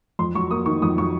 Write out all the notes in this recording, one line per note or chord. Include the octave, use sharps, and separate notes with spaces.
F2 C6
F#3 C#6
A#3 D#6
D#3 C#6
F2 D#6
F#3 C#6